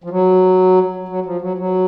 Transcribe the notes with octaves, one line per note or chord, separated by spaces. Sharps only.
F3
F#3
F#3
F3
F#3
F#3